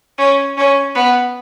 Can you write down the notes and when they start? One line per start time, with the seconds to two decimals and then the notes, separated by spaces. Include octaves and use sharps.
0.18 C#4
0.57 C#4
0.95 B3